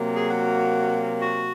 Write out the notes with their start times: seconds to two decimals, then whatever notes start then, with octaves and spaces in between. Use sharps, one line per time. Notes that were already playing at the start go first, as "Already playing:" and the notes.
Already playing: C3 F#3 A#3
0.15 G#4
0.30 F#4
1.21 F#4